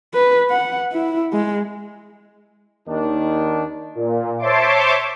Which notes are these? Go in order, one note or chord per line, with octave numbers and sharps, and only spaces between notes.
B4
F#5
E4
G#3
D#2 D#3 D4
A#2
C5 C#5 E5 A5 C6 D6